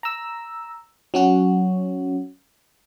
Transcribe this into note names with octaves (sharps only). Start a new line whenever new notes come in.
A#5 E6
F#3 C#4 F#4